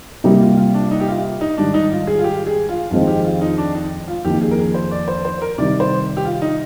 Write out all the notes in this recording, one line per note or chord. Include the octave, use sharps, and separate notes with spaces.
C3 G3 A#3 D#4
F4
F4
D4
D#4
G4
F4
D#4
G#2 D#3 G3 D4
D#4
F4
G#4
F4
G4
G#4
F4
F2 D#3 G#3 C4 F4
G4
F4
D#4
D4
D#4
F4
F2 D#3 A#3 G4
G#4
A#4
G#4
C5
D5
C5
C5
A#4
C3 D#3 G3 D5
C5
G4
F4
D#4